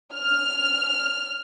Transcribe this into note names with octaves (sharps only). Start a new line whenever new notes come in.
F6